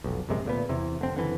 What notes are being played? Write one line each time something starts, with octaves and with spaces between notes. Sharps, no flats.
F1 B1
A#1 F#2 C3 G#3
D2 A#2 B3
E2 C3 E3
F1 D3 C4
F#1 D3 E3